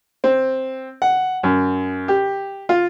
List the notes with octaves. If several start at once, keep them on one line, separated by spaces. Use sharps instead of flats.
C4
F#5
F#2
G4
F4